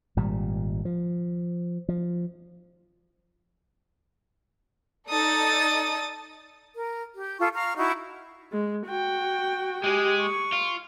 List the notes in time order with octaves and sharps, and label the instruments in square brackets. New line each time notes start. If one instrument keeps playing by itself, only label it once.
[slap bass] G#1 A#2 G3
F3
F3
[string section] D#4 A4 D5 [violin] D#6 A6
[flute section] A#4
G4
F4 A4 C#6
F5 A#5 C#6 F6
D#4 E4 F#4 C#6
[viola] G#3
F#4 G5
[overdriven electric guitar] G#3 G#4 [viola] G4
[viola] C#6
[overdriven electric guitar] F4